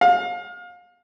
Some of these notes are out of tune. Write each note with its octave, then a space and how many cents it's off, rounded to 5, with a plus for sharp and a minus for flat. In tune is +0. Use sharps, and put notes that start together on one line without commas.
F5 +30